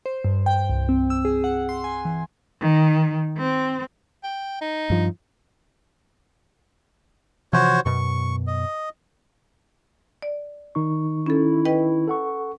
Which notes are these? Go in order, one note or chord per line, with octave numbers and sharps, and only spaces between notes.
C5
G2
G5
C2
C4
E6
G#4
F#5
C6
G#5
E3
D#3
C4
G5
D#4
G2 F3
C3 E3 F3 F#4 C5 C#5
F#2 B2 C#6
D#5
D5
D#3 D#4 C#6
C#4 E4 A4
B4 D#5 G5
A4 F#5 C#6